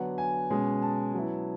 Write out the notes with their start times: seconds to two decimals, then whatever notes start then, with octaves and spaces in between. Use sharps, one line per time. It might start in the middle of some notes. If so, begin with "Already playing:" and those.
Already playing: D3 F#3 B3 D4 F#5
0.18 G#5
0.50 B2 G#3 C#4
0.82 A5
1.14 F#3 B3 E4